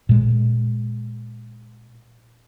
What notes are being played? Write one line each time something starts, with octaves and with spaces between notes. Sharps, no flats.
A#2 G#3